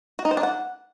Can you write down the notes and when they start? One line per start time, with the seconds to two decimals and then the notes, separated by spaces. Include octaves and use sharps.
0.19 F#4
0.25 D#4
0.31 C5
0.37 D4
0.43 F#5